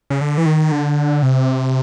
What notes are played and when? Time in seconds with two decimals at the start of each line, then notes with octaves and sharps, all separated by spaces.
0.10 C#3
0.21 D3
0.38 E3
0.46 D#3
0.72 D3
1.23 C3